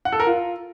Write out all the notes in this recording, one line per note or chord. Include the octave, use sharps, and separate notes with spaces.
F#5
A4
A#4
F4